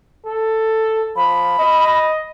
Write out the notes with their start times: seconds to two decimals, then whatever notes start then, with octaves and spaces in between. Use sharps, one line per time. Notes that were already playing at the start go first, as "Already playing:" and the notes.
0.25 A4
1.16 F3 B5
1.59 D#5